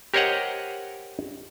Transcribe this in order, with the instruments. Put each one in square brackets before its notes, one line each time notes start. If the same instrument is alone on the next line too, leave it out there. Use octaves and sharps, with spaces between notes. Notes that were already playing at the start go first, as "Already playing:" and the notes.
[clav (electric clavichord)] G4 A#4 C5 C#5 D#5 F#5